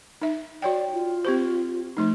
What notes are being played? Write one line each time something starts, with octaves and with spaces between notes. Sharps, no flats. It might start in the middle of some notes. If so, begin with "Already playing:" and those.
D#4 E5
F#4 C#5 D5 G5
F4
C4 G4 C5
F3 A3 D#4